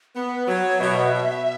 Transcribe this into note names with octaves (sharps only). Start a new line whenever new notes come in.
B3 B4
F#3 C#5
B2 E5
B2